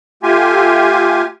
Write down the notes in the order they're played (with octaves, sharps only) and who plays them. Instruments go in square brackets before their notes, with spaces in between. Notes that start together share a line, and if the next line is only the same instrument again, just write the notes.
[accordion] A3 F4 G4 G#5